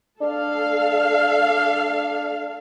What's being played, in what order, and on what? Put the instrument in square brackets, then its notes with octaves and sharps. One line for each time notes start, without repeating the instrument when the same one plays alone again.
[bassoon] D4 [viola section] A4 F5